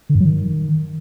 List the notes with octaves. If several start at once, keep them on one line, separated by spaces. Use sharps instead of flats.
D3
G2
F#3
D#3